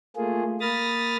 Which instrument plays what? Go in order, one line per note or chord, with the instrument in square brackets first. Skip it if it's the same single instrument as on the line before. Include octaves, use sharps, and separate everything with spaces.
[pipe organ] A3 A#3 F4 G#4
A#3 B5 D#6 F6 A6 A#6